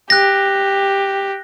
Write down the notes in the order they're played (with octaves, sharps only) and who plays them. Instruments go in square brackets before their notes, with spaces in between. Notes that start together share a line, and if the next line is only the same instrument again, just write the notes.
[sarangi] G4 [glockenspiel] F#6 A#6